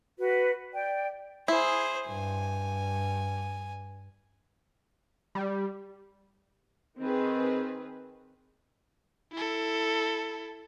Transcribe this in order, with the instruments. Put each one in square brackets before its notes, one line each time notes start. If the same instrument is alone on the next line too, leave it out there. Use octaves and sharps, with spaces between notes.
[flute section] F#4 B4
D5 G5
[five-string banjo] E4 [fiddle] G#4 C5
[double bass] G2 [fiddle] G#5
[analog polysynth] G3
[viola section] D#3 C4 G#4 B4
[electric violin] E4 A4